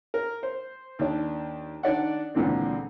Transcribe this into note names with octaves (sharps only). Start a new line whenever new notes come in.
A#4
C5
D#2 D4
D#3 D4 D5 F#5
C#2 A#2 D3 E3 C4